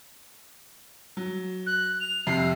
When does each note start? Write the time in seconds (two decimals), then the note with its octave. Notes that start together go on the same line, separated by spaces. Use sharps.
1.17 F#3
1.66 F#6
2.00 F7
2.27 F2 C3 C7